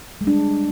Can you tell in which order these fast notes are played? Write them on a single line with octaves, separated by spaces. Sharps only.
G#3 G3 D4